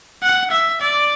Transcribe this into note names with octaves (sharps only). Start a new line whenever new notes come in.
F#5
E5
D5